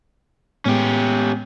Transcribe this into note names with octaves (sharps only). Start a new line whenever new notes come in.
A2 G#3 B3 C#4 G4